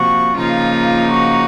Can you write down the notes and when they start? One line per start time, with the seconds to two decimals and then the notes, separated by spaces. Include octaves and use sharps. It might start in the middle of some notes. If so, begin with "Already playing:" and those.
Already playing: C3 F3 A#3 F#4
0.36 C#3 F3 A#3 D#4 F4
1.11 F#4